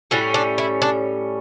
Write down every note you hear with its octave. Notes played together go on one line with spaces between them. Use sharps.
A2 G3 C#4 F#4
D4
E4
D4